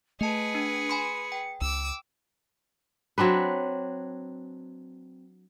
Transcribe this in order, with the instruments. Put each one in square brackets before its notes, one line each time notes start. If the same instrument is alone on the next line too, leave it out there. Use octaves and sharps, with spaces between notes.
[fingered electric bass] A3 [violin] G#4 B4 [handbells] D#5 A5 [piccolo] C#7
[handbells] D4
G#5 B5 C6
G5
[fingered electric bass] C#2 [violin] D6 E6
[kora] F#3 C4 D4 B4